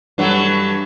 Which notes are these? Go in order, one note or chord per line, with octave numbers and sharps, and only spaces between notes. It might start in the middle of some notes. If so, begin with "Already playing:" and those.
G2 E3 F#3 A3